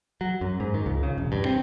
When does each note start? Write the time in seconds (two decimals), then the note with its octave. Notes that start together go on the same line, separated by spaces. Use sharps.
0.21 F#3
0.41 F#2
0.60 G#2
0.74 D#3
0.86 C#2
1.03 C#3
1.18 E1
1.32 G2
1.46 C4